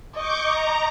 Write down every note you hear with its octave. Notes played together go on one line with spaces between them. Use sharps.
D#5 C#6 D6 G6
A#5